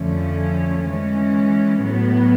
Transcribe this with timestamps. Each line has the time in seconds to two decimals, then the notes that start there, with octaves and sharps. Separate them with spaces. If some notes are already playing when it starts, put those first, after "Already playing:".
Already playing: F2 D3 F3 A3 C#4
0.86 E3 G#3 C#4
1.83 A2 F#3 B3